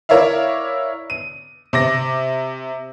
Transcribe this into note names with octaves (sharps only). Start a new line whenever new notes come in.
E4 A#4 C#5 D5 E5 F5
D#7
C3 D6 A#6